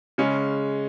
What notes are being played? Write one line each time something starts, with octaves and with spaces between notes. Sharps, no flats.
C#3 G#3 C#4